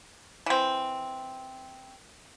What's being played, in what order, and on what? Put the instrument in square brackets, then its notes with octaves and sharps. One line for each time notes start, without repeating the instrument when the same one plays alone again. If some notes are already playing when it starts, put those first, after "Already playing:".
[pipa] E3 C4